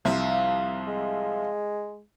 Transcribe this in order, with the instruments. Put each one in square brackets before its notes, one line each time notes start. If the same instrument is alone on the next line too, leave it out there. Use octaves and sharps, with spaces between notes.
[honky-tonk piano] C2 [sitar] F3 E5
[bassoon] G#3